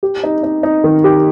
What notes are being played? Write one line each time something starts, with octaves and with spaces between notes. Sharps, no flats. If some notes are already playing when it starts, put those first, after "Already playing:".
G4
D#4
D#4
D#4
D#3
G4